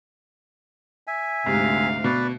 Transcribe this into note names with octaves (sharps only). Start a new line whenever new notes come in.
E5 G#5
D2 G#2 C3 F5
B2 B4 D5